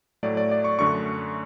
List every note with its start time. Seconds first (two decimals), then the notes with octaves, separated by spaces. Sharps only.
0.23 A2 F#3 A3 D5
0.37 D5
0.51 D5
0.64 C#6
0.79 F#2 D3 A3 C#6